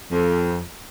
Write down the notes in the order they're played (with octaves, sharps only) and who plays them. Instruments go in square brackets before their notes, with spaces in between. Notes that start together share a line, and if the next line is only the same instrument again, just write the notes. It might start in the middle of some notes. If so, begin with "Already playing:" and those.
[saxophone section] F2